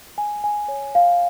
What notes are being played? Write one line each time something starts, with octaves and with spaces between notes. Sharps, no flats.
G#5
G#5
C#5
F5